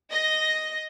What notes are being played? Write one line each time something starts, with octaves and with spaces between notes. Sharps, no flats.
D#5 A#6